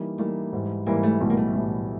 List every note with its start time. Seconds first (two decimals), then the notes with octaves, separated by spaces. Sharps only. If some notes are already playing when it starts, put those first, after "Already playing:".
Already playing: E3 G3 A#3 D#4
0.18 E3 G3 A3 A#3 D#4
0.52 G#2 E3 G3
0.86 G#2 E3 G3 A#3
1.03 A3
1.21 B1 A2 E3 G3
1.30 A#3
1.37 A3
1.54 B1 A2 E3 G3